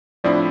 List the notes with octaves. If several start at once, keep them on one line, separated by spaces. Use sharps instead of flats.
A2 F3 C4 D4 E4